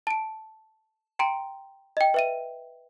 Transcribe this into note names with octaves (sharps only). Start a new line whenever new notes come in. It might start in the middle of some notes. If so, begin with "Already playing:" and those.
A5 D7
G5 A#5 C6 D7
D#5 G5
B4 E5 D#7